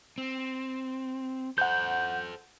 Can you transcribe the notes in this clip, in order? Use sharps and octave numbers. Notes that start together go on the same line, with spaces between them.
C4
A4 C5 F#5 G6